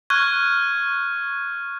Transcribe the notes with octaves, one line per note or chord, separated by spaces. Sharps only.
C#6 F6 F#6 G#6